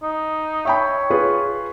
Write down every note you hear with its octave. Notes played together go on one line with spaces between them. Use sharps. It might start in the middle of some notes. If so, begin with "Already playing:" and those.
D#4
C#5 E5 G5 B5
F4 G#4 B4